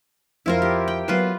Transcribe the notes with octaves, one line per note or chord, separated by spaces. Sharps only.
F2 E4 F4 A#4 C5
G4
G5
F#3 A#3 B3 F4 B4 C5